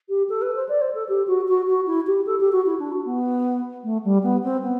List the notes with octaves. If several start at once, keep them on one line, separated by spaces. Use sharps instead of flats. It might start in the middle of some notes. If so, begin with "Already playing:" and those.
G4
A4
B4
C5
D5
C5
A4
G4
F#4
F#4
F#4
E4
G4
A4
G4
F#4
E4
D4
F#4
B3
A3
G3
B3
C4
B3